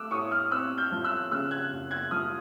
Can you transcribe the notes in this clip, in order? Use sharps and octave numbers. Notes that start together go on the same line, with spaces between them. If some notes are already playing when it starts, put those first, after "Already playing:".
Already playing: A3 D6 E6 F#6
A2 C#6 D#6
D#6 F6
C4 E6 F#6
F6 G6
F3
E6 F#6
C#3 E6 F#6
F#6 G#6
F#1
F#6 G#6
F3 D#6 F6